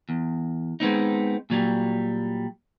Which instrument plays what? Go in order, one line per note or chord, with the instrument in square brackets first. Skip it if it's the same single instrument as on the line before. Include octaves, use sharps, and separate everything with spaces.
[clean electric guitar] E2
G#3 B3 C4 D#4
A#2 F#3 G3